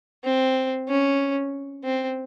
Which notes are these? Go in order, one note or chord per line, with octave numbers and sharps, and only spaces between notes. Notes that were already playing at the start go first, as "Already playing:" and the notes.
C4
C#4
C4